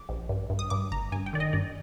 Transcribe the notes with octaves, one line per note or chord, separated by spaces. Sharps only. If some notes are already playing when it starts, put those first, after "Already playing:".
Already playing: D6
A#1
G2
G2
D#6
G2 D6
G1 A#5
G2 G#5
G5
D#3 D5
D#5
G2 D5